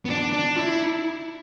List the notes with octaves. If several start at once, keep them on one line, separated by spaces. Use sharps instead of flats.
B3
D4
D4
E4